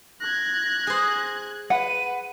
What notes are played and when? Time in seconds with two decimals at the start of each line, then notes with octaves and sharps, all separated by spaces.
0.21 F#6 G#6 A#6
0.87 G#4 C5
1.70 B4 F#5 D#7